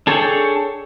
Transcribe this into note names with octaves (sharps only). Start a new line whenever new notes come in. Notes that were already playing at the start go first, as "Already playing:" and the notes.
D4 G#4 A4 C#5 G5